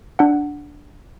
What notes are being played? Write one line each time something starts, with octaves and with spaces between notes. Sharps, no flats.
D4 F#5